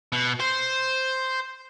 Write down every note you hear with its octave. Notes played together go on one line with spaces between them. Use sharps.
B2
C5